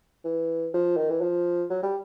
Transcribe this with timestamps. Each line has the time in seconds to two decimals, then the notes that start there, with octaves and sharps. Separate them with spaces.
0.25 E3
0.74 F3
0.97 D#3
1.10 E3
1.21 F3
1.70 F#3
1.83 G3